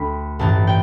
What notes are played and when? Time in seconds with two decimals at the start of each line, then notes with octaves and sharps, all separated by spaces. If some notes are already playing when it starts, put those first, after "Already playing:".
Already playing: D2 D3 G5 B5
0.39 A1 G2 E3 A5
0.67 G5